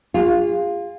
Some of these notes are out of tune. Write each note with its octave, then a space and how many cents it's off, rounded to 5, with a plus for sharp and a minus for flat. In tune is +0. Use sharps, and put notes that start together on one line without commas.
F4 +0 G#4 -35